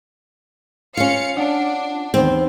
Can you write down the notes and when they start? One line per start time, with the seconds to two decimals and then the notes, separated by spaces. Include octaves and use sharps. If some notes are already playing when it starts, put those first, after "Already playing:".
0.97 C#4 F4 F5 C#7
1.36 D4 D#5 F#5
2.14 D#2 E3 B3 C4